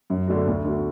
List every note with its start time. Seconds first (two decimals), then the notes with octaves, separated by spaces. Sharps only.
0.10 F#2
0.28 D3 A3 D4 F#4
0.47 D2
0.64 D3 A3 F#4